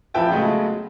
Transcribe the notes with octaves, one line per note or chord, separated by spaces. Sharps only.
A1 F3 B4 E5 G5 A5
C#3 F#3 G#3 A3 B3